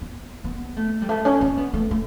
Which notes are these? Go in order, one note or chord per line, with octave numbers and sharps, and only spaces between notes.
B3
B3
A3
G3
A3
C#4
C#4
B3
A3
A3